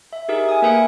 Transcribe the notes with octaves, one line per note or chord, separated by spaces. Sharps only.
E5
D#4 G4 G#4 A#4 E5
G#5 D#6
A#3 A#4 B4 E5 G5 C#7